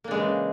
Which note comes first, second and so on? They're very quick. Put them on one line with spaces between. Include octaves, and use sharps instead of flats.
A#3 D4 G#3 E3 C#3